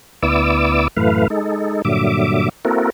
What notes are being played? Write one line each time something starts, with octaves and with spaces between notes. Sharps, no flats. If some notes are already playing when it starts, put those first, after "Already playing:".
D2 B3 E4 D5 D6 E6
F#2 A2 E3 A3 B4 F5
G#3 D#4 A4
G2 A#2 D3 F#3 E5 D6
A#3 C4 E4 F#4 A4 A#4